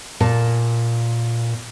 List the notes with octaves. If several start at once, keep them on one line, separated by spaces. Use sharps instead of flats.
A#2 A5